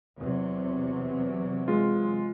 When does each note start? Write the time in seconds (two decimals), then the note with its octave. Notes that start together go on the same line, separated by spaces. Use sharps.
0.18 E2 C3 F#3
1.68 G#3 F4